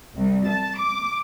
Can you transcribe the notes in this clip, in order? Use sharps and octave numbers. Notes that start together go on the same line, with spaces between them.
C2
A5
D6